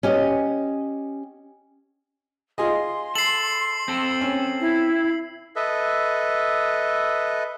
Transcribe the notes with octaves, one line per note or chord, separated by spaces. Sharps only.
C#4 G4 D#5
F4 G#4 D#5 C6
A4 C7 F#7
C4 A4
C#4
E4
A4 B4 D#5 E5